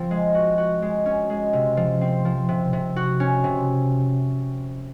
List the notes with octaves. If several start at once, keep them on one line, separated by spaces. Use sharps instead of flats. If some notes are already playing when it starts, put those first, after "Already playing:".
Already playing: F3 C4
G#3
F#4
F#4
G#3
C#4
G#3
C3
F3
C4
F3
C3
C3
F#4
C#4
C3